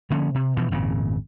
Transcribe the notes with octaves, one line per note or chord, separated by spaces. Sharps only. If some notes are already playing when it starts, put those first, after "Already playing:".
D3 F3 A#3 C#4
C3
B2 E3 F3
G#1 F2 A#2 C#3